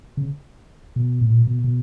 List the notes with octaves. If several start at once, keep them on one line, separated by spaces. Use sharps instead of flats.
C#3
B2
A2
A#2
B2
B2